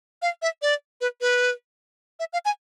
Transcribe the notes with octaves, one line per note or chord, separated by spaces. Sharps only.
F5
E5
D5
B4
B4
E5
F5
G#5